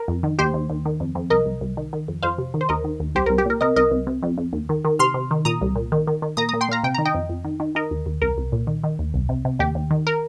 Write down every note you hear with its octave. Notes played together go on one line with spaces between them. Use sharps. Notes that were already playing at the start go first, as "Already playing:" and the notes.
Already playing: A#4
F2
D#3
D#2 G4 C5
D#2
D#2
D#3
F2
F2
C2 A#4 D#5
C2
C2
D#3
D#3
F2
F2 C5 F5
C3
D#3
C5
D#2 A#4 D#5
D#3
D#2
C2 G4 C5
C2 A#4
G4
A#2 A#4
C3 A#4 D#5
C2 A#4 D#5
C2
C3
F2
F2
D#2
D#3
D#3
C3 C6 F6
C3
D#3
A#2 A#5 D#6
C2
A#2
D#3
D#3
D#3
A#2 A#5 D#6
A#2 A#5 D#6
G5 C6
A#2 F5 A#5
C3 G5
D#3 A#5
D#5 G5
F2
F2
D#3
D#3
D#3 A#4 D#5
D#2
D#2
C2 A#4
C2
A#2
D#3
D#3
D#2
C2
C3
C3
D#2 G4
D#2
D#3
A#4